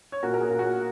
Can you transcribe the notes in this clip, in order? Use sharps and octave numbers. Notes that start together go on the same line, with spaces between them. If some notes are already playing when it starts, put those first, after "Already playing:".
C#5
A#2 F#4 A#4
A#4
G#4
A#2
F#4